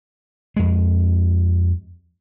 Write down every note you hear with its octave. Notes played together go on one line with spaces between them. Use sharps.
F2 G#3